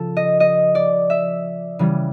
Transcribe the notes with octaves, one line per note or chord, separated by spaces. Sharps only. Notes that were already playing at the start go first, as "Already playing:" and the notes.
Already playing: C#3 F3 A4
D#5
D#5
D5
E5
C#3 E3 G3